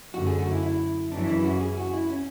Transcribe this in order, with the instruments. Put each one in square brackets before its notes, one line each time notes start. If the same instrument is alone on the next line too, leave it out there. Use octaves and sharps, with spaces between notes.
[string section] F#2 D3 A3 [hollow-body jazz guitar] F#4
[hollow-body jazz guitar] G#4
F#4
E4
E4
[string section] F#2 C#3 E3 [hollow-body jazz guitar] D4
[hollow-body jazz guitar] E4
F#4
G#4
F#4
E4
C#4